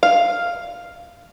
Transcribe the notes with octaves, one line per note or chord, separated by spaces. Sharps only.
F5